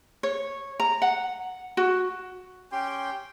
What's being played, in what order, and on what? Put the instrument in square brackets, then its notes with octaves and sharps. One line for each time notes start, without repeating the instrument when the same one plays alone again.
[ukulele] C#5
A#5
F#5
F#4
[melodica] C#4 G4 C6 [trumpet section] G5